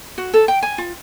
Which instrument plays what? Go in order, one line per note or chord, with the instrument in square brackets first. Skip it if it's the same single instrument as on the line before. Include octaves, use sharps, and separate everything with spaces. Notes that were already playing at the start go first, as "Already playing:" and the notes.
[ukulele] F#4
A4
G5
G#5
F4